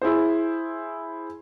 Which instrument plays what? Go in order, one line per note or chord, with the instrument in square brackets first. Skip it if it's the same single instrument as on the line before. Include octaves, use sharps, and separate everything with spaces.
[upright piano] E4 G#4 C5